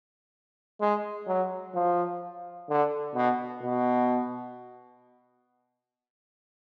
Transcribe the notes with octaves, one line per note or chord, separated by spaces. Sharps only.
G#3
F#3
F3
D3
B2
B2